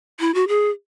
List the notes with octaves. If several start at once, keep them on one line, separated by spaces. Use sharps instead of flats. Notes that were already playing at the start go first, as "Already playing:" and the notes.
E4
F#4
G#4